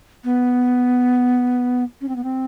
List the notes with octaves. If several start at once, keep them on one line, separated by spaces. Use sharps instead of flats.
B3
C#4
C4
B3
C4